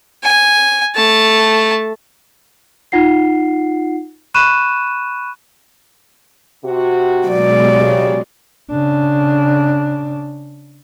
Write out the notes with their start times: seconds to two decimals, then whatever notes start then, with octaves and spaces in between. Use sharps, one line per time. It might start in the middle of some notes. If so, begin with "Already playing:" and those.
0.24 G#5
0.95 A3 A5
2.92 D#4 F4 F#5 C7
4.34 B5 C#6 F#6 D#7 E7
6.64 C3 F#4
7.27 B2 F#3 G#3 D5
7.60 C#3 G4
8.70 C#3 D4